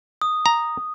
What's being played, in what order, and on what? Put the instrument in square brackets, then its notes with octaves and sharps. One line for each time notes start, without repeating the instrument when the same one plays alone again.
[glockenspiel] D#6
[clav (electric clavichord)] A#5